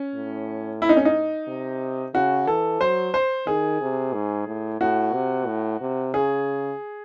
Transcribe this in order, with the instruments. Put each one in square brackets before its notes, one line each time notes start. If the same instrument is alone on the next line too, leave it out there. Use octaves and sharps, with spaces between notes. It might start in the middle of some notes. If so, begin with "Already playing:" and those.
Already playing: [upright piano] C#4
[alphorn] A2
[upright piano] E4
D#4
C#4
D#4
[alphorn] C3
[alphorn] C#3 [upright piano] F#4
[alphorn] E3 [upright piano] A4
[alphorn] F#3 [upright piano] C5
[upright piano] C5
[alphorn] D#3 [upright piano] G#4
[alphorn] C3
G#2
A2
[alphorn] A2 [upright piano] F#4
[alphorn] C3
A2
C3
[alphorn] C#3 [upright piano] G#4